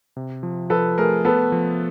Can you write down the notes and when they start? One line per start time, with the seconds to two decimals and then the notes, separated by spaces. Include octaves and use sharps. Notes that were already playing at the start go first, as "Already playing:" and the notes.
0.16 C3
0.43 F3
0.70 F3 A4 B4
0.98 A3 G#4 A#4
1.25 B3 A4 B4
1.52 F3